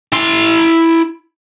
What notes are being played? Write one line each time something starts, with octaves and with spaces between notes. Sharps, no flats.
E4 C6